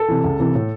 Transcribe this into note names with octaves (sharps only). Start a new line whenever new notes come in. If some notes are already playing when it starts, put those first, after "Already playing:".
Already playing: A4
C3 E3
C#2
C3 E3
A2